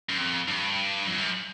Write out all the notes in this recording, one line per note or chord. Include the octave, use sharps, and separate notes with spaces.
F#2
F2
G2
F2
F#2